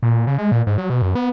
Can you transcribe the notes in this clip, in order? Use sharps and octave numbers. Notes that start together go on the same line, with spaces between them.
A#2
C#3
G#3
A#2
G#2
F#3
B2
F#2
B3